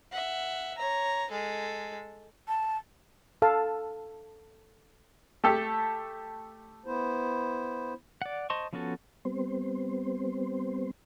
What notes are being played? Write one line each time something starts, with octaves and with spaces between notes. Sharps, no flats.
E5 F#5
C#5 A#5
G#3 A4
A5
A4 F5 A5
A3 G4 A4
B3 E4 C5
D5 F#5
C5 D#5 A5 C6 C#6
F3 B3 C#4 F#4 A4
G3 B3 C4 C5